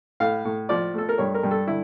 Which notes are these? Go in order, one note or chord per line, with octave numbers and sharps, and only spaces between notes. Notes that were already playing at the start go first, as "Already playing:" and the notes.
A2 F5
A2
F3 D5
A3 A4
A#4
G2 C#5
A#4
G2
A4
D3 E4